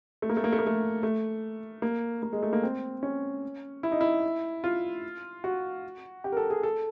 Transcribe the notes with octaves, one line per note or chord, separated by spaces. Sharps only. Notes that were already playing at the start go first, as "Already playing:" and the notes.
A3
A#3
A3
A#3
A3
A#3
A3
A3
A#3
A#3
G#3
A3
A#3
C4
C#4
E4
D#4
E4
F4
F#4
G4
A#4
A4
G#4
A4